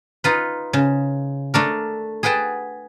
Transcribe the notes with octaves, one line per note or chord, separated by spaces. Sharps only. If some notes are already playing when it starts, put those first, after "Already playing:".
D#4 F4 B4
C#3
A3 D4 A#4
G#4 B4 F#5 G5 A5